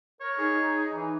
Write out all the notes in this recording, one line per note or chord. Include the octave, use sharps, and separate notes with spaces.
A#4 C#5
D#4 G#4
E3